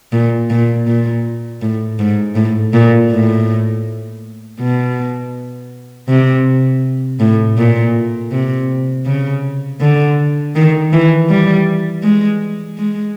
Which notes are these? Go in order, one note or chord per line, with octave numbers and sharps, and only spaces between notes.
A#2
A#2
A#2
A2
G#2
A2
A#2
A2
B2
C3
A2
A#2
C3
C#3
D3
D#3
E3
G3
G#3
G#3